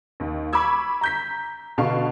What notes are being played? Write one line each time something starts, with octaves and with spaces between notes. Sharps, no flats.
D#2
B5 C#6 D6 E6 G#6
A#5 G6 B6
B2 D3 F5 A5 C#6